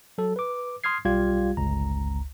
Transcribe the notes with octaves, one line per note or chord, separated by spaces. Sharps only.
F#3 A4
B4 D6
C6 D#6 F6 G#6 C7
B1 G3 F4 G4 F5 G#6
G1 C#2 A#5